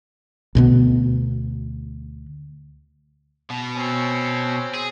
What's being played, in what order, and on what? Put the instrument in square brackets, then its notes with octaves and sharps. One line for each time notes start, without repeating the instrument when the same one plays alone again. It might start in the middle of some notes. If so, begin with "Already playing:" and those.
[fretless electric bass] D2 B2 B3
[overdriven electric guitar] B2
[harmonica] C4 C#4
[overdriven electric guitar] G#4